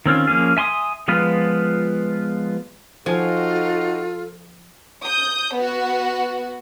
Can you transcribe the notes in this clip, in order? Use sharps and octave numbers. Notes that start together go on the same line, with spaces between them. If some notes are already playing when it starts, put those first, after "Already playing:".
D#3 C4 C#4 F4
F3 A#3 C#4 G#4
E5 G#5 C6 C#6 D#6
F3 G#3 B3 F4 B4
F3 D#4 F4 F#4 A4 G#5
D#6 G6
B3 F#4